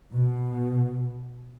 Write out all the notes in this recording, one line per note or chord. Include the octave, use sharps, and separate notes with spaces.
B2